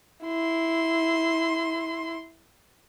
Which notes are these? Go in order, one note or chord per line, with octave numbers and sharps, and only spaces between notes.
E4 C6